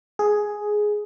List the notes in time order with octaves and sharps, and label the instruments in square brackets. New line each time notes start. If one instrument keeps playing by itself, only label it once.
[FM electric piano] G#4